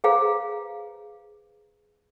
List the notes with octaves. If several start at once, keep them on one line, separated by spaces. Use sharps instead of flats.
G#4 B4 C5 F5 A#5